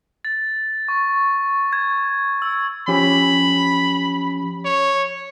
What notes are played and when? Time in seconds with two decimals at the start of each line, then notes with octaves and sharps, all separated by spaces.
0.25 A6
0.88 C#6
1.73 G#6
2.42 E6
2.88 F3 C#4 G4 B5
4.65 C#5